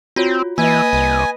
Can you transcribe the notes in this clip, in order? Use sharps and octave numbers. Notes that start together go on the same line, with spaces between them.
C4 F4 F#4 C#5
E3 A#3 B4 D#5 G#5
C2